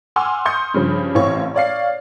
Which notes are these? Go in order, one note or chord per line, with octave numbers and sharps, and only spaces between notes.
F#5 G#5 C6 D6 E6 F6
C6 C#6 D#6 G6 C#7
G2 C#3 F3
A1 E3 C4 C#5 F5 C#6
C#5 D5 F5 C7